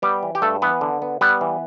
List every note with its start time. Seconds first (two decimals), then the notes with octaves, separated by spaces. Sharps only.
0.02 G3 B3 G4
0.23 E3
0.35 G4
0.42 G2 A3 A4
0.62 E3 B3 B4
0.81 D3
1.02 B3
1.21 G3 B3 B4
1.41 E3